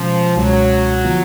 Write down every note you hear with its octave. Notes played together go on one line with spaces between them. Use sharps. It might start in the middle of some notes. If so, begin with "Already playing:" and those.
Already playing: B2 F3 G#3 C#4
C#2 B2 F#3 G#3 C#4
D3 F3 B3 F4